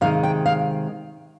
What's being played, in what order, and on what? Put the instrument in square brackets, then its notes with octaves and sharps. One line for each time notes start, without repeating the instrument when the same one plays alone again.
[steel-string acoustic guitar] C3 D#3 G#3 F5
G5
F5